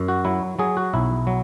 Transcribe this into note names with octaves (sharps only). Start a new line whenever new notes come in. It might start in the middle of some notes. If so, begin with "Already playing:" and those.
Already playing: F#2
F#4
F#3 E4
F#3 G#4
F#4
B1 E4
F#3